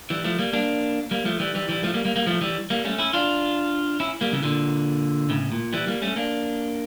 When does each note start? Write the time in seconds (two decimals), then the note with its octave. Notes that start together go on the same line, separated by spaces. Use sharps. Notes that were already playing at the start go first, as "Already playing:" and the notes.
0.10 E3 G3
0.24 F3 A3
0.39 G3 A#3
0.53 A#3 D4
1.11 G3 A#3
1.25 F3 A3
1.39 E3 G3
1.55 E3 G3
1.69 E3 G3
1.83 F3 A3
1.94 G3 A#3
2.05 G3 A#3
2.16 G3 A#3
2.27 F3 A3
2.41 E3 G3
2.70 G3 A#3
2.85 A3 C#4
2.98 C#4 E4
3.13 D4 F4
4.00 C#4 E4
4.21 G3 A#3
4.33 C#3 E3
4.43 A#2 D3
5.30 A2 C#3
5.52 A#2
5.73 E3 G3
5.87 G3 A#3
6.02 A3 C#4
6.16 A#3 D4